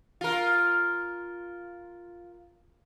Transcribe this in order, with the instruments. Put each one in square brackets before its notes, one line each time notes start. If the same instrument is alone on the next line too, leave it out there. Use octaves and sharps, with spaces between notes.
[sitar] F4 A#4